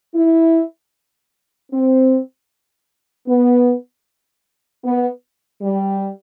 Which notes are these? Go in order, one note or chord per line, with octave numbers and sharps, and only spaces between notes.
E4
C4
B3
B3
G3